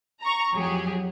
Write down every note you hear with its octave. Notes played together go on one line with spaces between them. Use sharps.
A#5 C#6
F2 F#3 G4 G#4